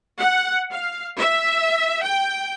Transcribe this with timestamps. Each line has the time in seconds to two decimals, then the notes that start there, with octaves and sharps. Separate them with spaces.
0.19 F#5
0.72 F5
1.19 E5
2.03 G5